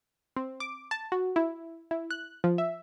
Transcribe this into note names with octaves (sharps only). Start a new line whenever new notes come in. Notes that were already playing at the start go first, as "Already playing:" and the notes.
C4
D6
A5
F#4
E4
E4
F#6
F3
E5